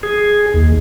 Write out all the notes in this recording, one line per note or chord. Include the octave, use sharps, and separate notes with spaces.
G#4
D#2